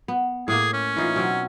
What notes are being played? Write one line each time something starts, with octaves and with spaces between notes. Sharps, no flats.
B3
A2 A#3 G#4
C#4
E3 D#4 F4
B2 F#3 C4